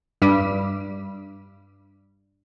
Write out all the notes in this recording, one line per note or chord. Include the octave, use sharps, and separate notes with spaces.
G2 G3